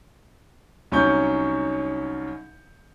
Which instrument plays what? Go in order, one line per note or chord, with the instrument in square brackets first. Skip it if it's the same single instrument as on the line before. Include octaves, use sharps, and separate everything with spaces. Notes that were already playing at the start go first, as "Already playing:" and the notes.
[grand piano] C2 F#3 C#4 D#4 C#6 G6